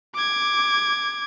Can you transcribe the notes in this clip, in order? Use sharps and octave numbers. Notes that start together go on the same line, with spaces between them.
D6 G#6